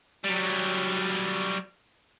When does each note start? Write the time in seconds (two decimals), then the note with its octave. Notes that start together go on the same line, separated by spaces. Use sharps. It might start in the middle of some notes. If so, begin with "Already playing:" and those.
0.24 F#3 G3